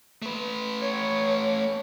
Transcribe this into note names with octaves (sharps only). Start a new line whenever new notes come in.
A3 B4
C#5